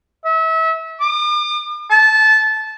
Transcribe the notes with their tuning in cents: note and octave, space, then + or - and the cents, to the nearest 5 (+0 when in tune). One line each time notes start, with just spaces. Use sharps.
E5 -30
D6 +45
A5 -20